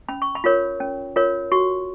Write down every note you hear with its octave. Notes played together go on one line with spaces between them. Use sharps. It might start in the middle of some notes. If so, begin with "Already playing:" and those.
C#4 B5
C#6
B5
F4 A#4 C#5
C#4
F4 A#4 C#5
F#4 C#6